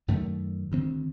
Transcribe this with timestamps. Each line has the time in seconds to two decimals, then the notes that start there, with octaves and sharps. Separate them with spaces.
0.08 F#2 D#3 A3
0.72 D2 D#3 C4